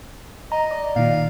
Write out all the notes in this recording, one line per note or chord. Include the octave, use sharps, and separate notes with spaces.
D#5 A#5
D5
A#2 D#3 F5